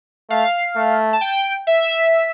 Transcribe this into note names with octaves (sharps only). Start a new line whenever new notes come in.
A3 F5
A3
A5
G5
E5